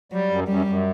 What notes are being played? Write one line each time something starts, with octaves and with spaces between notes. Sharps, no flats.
F#3 G3
F#2
F#2 G3
F#2